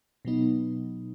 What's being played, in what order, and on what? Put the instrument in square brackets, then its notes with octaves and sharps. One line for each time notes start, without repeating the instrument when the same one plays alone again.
[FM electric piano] B2 F#3 B3 D#4